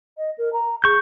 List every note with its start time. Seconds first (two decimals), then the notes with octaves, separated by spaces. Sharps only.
0.17 D#5
0.38 A#4
0.53 A#5
0.84 G#4 C#6 G6